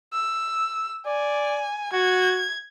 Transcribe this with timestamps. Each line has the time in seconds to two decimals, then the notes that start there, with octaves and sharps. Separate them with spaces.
0.13 E6
1.06 D5 G#5
1.93 F#4 G#6